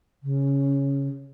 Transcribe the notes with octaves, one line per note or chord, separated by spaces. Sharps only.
C#3